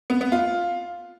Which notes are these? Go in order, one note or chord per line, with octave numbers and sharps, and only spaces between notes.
B3
B3
F4